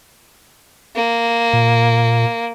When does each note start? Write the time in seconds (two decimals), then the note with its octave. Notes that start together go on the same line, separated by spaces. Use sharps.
0.96 A#3
1.53 A#2